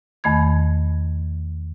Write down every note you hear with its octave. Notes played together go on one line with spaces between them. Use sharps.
E2 D#3 A3 B5 G#6